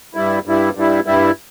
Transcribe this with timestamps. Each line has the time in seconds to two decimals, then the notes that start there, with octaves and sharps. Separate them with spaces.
0.14 G2 G3 E4
0.46 G2 G3 E4
0.75 G2 G3 E4
1.06 G2 G3 E4